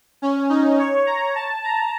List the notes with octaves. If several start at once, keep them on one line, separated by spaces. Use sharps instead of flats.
C#4
D#4
C#5
A#5
A5
A#5